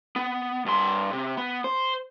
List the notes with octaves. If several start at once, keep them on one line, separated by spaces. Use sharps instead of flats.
B3
G2 C6
C3
B3
C5